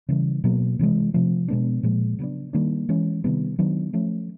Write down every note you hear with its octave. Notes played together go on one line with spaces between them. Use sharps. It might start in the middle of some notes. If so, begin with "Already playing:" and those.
C#3 E3 G3
B2 F#3 A#3
C3 E3 G#3
C3 F3 A3
B2 G#3 B3 D4
A#2 F3 G#3
C#3 F#3 B3 D4
D#3 G3 A#3 D4
E3 G#3 C#4
C3 D#3 G3 B3
D#3 F#3 B3 D4
F3 A3 C#4